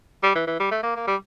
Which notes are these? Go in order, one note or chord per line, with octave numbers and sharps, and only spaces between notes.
G3
E3
E3
G3
A3
A#3
A#3
G3